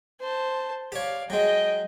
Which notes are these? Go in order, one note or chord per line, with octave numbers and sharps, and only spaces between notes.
C5 A5
G4 C#5 D5 F5
F#3 G#3 D#5 G5